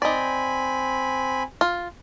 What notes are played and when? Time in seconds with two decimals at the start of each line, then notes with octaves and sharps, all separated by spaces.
0.02 C4 D#4 D5 G#5 B5
1.61 F4